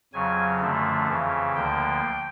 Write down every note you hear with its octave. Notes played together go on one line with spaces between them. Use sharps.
F2 C#3 F#3 G#5
F#2 D3 F3 A3
F2 C#3 E3
D2 D3 F3 A#3 G5